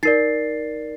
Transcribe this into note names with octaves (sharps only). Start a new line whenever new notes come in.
D#4 A#4 D5 A6 C7